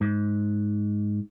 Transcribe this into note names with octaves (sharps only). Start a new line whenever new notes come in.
G#2